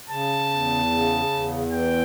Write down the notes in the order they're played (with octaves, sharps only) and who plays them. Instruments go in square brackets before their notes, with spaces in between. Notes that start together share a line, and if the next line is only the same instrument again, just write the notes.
[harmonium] C#3 [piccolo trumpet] A5
[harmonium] E2
C#3
E2
[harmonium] E3 [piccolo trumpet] G5